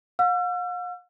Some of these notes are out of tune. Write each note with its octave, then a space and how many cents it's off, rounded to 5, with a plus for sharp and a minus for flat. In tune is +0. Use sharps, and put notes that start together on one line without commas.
F5 +45 E6 +45